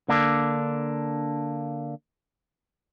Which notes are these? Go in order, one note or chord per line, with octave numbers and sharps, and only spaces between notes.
D3 A#3 D4